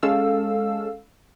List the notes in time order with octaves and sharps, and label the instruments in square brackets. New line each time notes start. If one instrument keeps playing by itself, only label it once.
[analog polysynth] G#3 C#4 A4 F5 E6